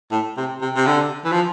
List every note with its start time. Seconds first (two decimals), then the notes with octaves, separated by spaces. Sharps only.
0.11 A2
0.37 C3
0.61 C3
0.75 C3
0.87 D3
1.24 E3
1.32 F3